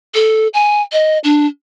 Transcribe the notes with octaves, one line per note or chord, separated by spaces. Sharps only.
A4
G#5
D#5
D4